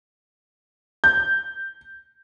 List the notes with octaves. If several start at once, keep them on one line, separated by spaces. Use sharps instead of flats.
G6